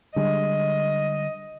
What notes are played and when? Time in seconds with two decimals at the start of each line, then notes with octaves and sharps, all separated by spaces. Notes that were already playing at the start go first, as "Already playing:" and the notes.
0.16 D3 G3 G#3 D#5